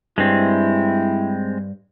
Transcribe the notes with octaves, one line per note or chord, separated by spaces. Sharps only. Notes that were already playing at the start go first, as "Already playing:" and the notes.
G2 G#3 C4 E4